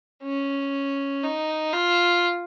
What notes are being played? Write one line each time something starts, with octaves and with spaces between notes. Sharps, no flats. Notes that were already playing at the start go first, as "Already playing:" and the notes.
C#4
D#4
F4